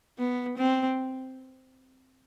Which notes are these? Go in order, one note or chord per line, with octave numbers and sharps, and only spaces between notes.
B3
C4